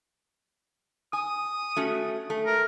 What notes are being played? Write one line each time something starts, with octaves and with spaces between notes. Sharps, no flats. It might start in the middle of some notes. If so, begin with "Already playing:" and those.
G#5 D#6
A3 C#4 F#4
A3
A#4